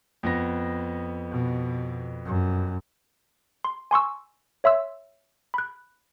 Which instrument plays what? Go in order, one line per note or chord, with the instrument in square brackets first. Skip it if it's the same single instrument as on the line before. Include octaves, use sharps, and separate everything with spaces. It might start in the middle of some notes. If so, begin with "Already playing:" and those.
[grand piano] F2 B3 A#6
[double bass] B2
F#2
[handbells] C6
G#5 C6 C#6 E6
C#5 E5 C6 E6
B5 F#6